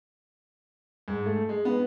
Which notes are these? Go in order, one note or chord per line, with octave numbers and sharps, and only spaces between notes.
G#2
A3
G#3
B3